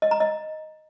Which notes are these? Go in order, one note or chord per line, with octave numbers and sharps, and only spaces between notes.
D#5
A#5
D#5